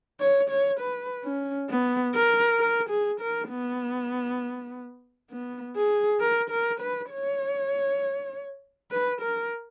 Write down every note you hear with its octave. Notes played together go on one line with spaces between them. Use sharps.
C#5
C#5
B4
C#4
B3
A#4
A#4
G#4
A#4
B3
B3
G#4
A#4
A#4
B4
C#5
B4
A#4